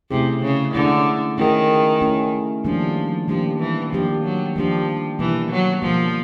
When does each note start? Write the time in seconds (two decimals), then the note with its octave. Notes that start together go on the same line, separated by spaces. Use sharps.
0.10 C3 A3 C#4 E4 G#4
0.42 C#3
0.74 D3 A3 C#4 E4 G#4
1.38 D#3 A3 C#4 E4 G#4
2.01 A3 C#4 E4 G#4
2.65 D#3 F3 G3 A#3 D4 G4
3.28 D#3 F3 G3 A#3 D4 G4
3.60 E3
3.92 D#3 F3 G3 A#3 D4 G4
4.24 F#3
4.56 D#3 F3 G3 A#3 D4 G4
5.19 B2 E3 G3 A#3
5.51 F#3
5.82 B2 F3 G3 A#3